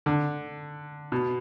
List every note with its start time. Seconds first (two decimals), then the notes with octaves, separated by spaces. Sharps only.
0.06 D3
1.12 B2